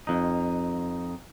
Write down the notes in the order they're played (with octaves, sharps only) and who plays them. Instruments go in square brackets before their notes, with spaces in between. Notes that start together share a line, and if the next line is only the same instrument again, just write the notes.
[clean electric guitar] F2 D#4